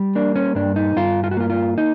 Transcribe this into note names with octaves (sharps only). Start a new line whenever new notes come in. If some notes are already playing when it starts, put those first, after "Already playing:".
Already playing: G3
A#3 D4
C#4
G2 D4
D#4
G2 F4
F4
F#4
A#3 F4
F4
D#4